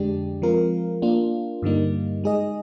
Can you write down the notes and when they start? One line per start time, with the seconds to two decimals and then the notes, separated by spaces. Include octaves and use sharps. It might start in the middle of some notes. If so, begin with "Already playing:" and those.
Already playing: F2 D3 G#3 D4 G4
0.42 F3 G#3 C4 F4 A#4
1.02 A#3 D4 F4
1.62 G2 D3 G3 A#3 D#4
2.24 G#3 D#4 G#4 D#5